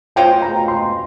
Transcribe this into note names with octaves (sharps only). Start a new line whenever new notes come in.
G#3 C#4 F4 C5 G5
A#5
C6